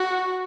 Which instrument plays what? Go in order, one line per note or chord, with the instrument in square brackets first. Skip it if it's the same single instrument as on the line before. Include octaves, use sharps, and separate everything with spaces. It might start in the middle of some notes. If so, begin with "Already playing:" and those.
Already playing: [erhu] F#4